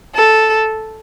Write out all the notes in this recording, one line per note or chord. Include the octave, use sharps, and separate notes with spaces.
A4